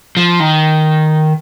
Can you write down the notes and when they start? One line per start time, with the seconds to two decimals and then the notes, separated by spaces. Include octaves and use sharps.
0.17 F3
0.40 D#3